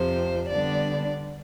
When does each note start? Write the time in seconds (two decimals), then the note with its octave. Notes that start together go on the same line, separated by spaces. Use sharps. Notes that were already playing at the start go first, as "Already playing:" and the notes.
Already playing: F2 C3 F3 C5
0.49 D3 G3 B3 D4 D5